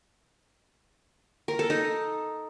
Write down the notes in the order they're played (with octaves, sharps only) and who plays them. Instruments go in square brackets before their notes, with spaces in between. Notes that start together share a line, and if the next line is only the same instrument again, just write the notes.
[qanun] A#4
A4
D#4